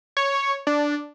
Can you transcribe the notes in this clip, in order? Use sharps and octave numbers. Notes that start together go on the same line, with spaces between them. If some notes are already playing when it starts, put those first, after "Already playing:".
C#5
D4